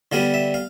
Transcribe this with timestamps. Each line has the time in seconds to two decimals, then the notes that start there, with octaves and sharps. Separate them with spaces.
0.12 D3 G3 B3 F5
0.34 E5
0.54 F5